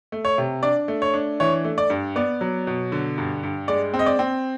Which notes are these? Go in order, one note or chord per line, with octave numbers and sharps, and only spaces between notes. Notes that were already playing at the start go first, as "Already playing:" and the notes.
A3
C#5
C3
D4 D5
A3
C#5
D4
E3 C#5
A3
D5
G2
B3 D5
F#3
B2
D3
G2
G2
G#3 D5
C4
D#5
D5
C4